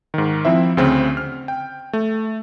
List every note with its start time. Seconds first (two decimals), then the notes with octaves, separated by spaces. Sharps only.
0.14 G#2 D#3
0.45 F3 C4 E4 C5 E5
0.77 D2 C#3 C4
1.17 F6
1.48 G5
1.93 A3